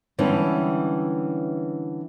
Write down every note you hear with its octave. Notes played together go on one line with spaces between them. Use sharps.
D3 E3 G3 G#3 B3 C#4